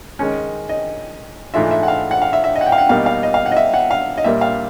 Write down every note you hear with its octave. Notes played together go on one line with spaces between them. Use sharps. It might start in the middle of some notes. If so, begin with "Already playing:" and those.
D#3 G#3 C#4
D#5
G#2 E3 A3 D4 F4 E5
E5
F#5
F5
F#5
F5
E5
E5
D#5
F#5
G5
F5
F#5
B2 G3 A#3 D#4 F5
F5
D#5
F5
F#5
D#5
E5
F#5
F5
D#5
A#2 G3 A#3 E5
F5